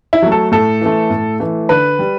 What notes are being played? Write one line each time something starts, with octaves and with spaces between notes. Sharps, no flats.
E4
F#3 A3
A4
A2 A4
E3 A3
A2
E3 A3
D3 B4
G3